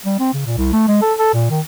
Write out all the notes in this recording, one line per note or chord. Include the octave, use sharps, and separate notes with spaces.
G3
C4
C#3
A#2
C2
A3
G#3
A4
A4
A#2
D#3